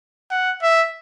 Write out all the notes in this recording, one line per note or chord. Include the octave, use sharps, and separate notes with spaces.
F#5
E5